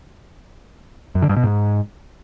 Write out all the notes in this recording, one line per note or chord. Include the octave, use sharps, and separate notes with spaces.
F#2
D3
G2
B2
G#2